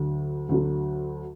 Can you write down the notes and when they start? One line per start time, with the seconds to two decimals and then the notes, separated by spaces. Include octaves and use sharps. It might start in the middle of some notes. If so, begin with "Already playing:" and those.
Already playing: D2 D3 F#3
0.49 D2 D3 F#3